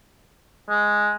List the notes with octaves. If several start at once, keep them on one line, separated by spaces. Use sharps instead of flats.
G#3